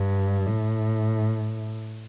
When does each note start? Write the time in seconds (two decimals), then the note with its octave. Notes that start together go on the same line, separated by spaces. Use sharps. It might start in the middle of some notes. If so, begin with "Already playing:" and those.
Already playing: G2
0.46 A2